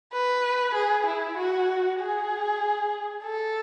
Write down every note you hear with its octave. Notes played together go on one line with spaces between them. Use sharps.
B4
G#4
E4
F#4
G#4
A4